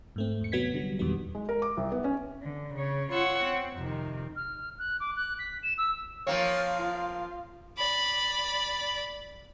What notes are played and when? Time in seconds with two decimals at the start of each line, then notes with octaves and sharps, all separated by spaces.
0.16 G#2 A3 C4
0.41 E2 C#7
0.52 C3 F#3 B3 G#6 B6
0.74 D3 F#3 G3
0.99 E2 A#2 D#3 F#3 G3 B3
1.35 G#3
1.49 A#4
1.62 D6
1.77 C2
1.92 B3
2.04 C#4
2.42 D3
2.74 C#3 C#5
3.12 F4 C#5 F#5 C#6 E6
3.43 C4
3.75 F2 C3 D#3
4.36 F6
4.79 F#6
5.00 D6
5.16 F#6
5.39 B6
5.63 E7
5.78 E6
6.27 F3 A#3 C4 C#5 F5
6.79 F4
7.78 D5 B5